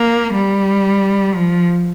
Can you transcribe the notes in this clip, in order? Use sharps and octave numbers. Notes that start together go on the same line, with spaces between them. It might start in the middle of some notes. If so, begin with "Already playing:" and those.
Already playing: A#3
G3
F3